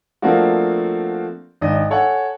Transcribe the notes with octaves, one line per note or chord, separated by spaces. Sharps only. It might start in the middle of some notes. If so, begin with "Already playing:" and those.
F3 A3 A#3 C4 D4 F#4
G#1 D4 D#5
A4 C#5 F#5 G#5